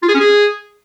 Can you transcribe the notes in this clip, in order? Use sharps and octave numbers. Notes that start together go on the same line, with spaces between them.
F4
G#4
C#4
G#4